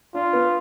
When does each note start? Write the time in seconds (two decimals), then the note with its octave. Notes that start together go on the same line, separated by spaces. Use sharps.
0.14 D4 F4
0.33 B3